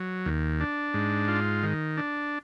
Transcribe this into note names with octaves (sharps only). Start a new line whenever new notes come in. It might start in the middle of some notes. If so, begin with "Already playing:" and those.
Already playing: F#3
D#2
D4
G#2
F4
D#3
D4